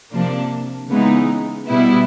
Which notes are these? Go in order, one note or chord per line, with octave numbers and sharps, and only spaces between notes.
C3 F3 A#3 D4
C#3 E3 G#3 B3 D#4
B2 G3 B3 E4